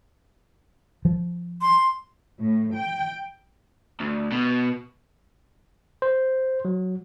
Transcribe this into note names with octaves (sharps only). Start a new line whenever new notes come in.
F3
C6
A2
G5
D2
B2
C5
F#3